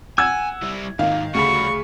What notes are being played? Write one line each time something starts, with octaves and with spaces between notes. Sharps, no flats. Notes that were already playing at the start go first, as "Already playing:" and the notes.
F#5 G#5 E6 G#6
G3 E4
G#2 D#3 A#3 F5
D2 C#3 G3 F#4 B5 C#6